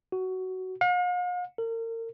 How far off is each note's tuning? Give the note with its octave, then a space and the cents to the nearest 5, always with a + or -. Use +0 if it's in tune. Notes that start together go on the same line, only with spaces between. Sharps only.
F#4 +15
F5 +45
A#4 -35